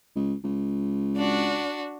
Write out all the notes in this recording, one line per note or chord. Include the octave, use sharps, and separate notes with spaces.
C#2
C#2
D4 F#4